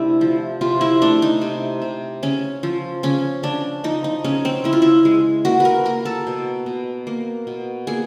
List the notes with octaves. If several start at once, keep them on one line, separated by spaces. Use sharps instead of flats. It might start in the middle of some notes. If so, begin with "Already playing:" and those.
Already playing: C3 A3 D4 E4
F3
C3 F4
E4
A3 D4
D#4
C3
C3
C#3 C#4
F3
C#3 C#4
C#3 D4
F3 D#4
D#4
C#3 C#4
C4
C#3 E4
F4
E4
G#3
A#3 F#4
A#4 B4
A#3 A#4
A4
B2
B2
A#3
B2
A#3 G#4